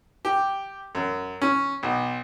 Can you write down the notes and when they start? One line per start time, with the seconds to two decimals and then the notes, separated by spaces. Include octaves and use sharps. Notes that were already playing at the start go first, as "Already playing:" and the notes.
0.25 G4
0.95 F#2
1.42 C#4
1.83 B1